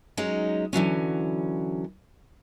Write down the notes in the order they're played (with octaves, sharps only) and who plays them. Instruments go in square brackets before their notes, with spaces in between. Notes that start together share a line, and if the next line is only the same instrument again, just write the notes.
[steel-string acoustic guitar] F#3 G#3 C#4 D#4
D3 E3 F#3 C#4